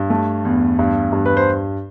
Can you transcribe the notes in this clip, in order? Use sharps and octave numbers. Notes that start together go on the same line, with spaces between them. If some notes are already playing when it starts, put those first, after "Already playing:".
Already playing: G2
A3
E2
G2
G2
B4
C5